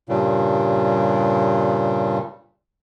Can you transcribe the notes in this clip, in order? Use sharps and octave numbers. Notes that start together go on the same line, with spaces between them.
G2 A#2 C#3 G3